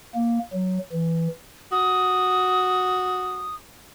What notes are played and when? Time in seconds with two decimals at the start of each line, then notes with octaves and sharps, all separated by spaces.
0.15 A#3
0.53 F#3
0.93 E3
1.72 F#4 D#6